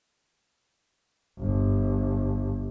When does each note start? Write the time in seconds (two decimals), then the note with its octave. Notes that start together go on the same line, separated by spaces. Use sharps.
1.39 G1